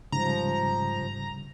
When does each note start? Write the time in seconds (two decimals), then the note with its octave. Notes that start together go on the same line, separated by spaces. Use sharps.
0.12 G#2 C#3 F3 G3 A#5